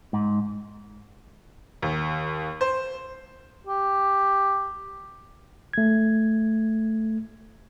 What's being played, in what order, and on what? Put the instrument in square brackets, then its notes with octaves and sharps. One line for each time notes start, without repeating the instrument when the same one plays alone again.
[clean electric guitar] G#2
[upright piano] D#2
C5
[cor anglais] G4
[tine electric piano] A3 G#6